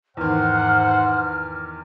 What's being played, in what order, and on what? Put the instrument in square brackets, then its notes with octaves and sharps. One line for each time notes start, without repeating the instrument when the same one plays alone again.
[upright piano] E2 D#3 [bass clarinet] G#2 [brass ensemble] C5 F#5 [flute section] F6